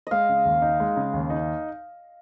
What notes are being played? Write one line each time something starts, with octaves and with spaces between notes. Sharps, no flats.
G#3 D#5 F5
C#3
D#2
D#4
G#3
C#3
D#2
D#4